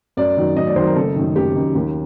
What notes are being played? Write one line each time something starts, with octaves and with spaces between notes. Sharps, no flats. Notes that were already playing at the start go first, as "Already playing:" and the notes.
F#2 D5
D#3 F#3
F#2 D#5
D5
D#3 F#3 C5
A#4
F#1 A4
F#2 D#3
F#1 G4
F#2 D#3
D#2